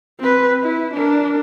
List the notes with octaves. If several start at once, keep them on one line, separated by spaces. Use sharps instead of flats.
C4 B4
E4
D4 A#4